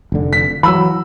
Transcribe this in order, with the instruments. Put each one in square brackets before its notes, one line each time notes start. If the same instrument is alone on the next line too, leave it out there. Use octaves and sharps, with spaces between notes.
[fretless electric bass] F1 D3
[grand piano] B6
[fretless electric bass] E3 F#3 [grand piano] B5 E6